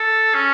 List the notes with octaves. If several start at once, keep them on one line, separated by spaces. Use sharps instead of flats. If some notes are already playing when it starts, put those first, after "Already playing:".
Already playing: A4
C#4